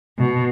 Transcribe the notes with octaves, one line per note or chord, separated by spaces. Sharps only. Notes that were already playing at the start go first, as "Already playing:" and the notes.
B2